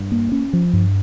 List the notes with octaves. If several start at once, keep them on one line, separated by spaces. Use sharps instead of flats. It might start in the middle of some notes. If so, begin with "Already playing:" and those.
Already playing: G2
A#3
C#4
F3
G2